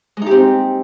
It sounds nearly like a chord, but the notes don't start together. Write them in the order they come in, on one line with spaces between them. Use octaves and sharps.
G#3 D#4 G4 C4